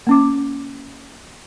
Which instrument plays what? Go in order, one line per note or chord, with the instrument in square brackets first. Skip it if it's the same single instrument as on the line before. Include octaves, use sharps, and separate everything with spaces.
[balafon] A#3 C#4 D6